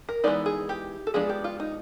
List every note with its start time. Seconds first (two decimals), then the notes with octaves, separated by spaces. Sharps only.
0.09 A#4
0.24 E3 G#3 B3 D#4 D5
0.46 G#4
0.69 G4
1.07 A4
1.14 F3 G#3 B3 D4 G#4
1.29 G4
1.44 F4
1.60 D#4